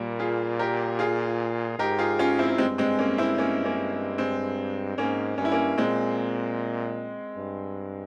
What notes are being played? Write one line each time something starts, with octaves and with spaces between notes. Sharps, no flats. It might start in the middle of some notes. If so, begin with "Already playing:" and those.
Already playing: A#2 G3 A#3
F4 G#4
G4 A#4
F4 G#4
G#2 G4 A#4
F4 G#4
C#4 F4
C4 E4
G2 G#3 C4
G#3 C4
A#3 C#4
C4 E4
A#3 C#4
A#3 C#4
G#3 C4
G#2 A#3 C#4
G2 C#4
E4
A#3 C#4
A#2 G#3 C4
G2